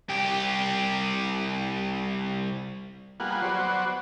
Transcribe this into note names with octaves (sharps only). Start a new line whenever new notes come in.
C2 G4
G3 A#3 B3 F4 G#4 F#5
F#3 B3 F#4 C5 D5